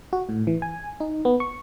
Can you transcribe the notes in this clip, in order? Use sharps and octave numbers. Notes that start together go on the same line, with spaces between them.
F#4
A2
E3
G#5
D#4
B3
C#6